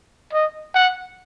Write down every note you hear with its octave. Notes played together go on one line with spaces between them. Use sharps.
D#5
F#5